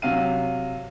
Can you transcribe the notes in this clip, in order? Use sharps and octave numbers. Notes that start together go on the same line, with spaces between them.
C3 F#3 F5 D#7